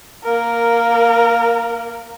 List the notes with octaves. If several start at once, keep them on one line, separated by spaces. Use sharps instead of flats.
A#3 A#4